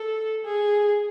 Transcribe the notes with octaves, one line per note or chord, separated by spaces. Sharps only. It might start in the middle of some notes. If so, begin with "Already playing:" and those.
Already playing: A4
G#4